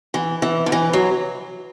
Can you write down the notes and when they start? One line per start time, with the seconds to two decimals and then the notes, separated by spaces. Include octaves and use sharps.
0.14 E3
0.42 E3
0.66 D3
0.72 E3
0.93 F#3